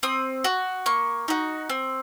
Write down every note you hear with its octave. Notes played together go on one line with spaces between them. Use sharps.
C4 D#6
F#4
A#3 C#6
D#4 F#4
C4